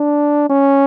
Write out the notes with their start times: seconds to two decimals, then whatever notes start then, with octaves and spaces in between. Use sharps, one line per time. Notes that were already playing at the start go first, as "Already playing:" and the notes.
Already playing: D4
0.49 C#4